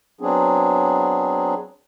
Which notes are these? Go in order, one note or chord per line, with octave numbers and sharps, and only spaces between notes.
F#3 B3 C4 D4 G#4